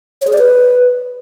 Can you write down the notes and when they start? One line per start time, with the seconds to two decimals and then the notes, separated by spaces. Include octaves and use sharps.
0.21 C#5
0.27 G#4
0.33 D5
0.38 B4